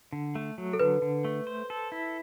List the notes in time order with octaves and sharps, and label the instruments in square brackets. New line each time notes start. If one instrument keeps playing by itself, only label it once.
[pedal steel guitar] D3
A3
F#3
[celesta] A4
[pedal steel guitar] D3 [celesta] B4
[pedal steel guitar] D3
A3
C5
A4
E4